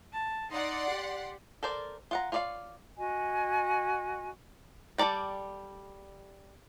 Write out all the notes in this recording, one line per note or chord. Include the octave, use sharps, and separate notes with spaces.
A5
D#4 D5 F#5 C6
G4
A4 A#4 C5 D5
F4 F#5 A#5
F4 C#5 D5 E5 F5
F#4 D#5 G#5
G3 A4 A#4 D5 G5